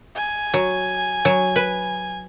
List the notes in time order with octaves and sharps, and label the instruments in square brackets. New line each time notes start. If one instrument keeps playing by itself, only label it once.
[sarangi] G#5
[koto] F#3
F#3
B4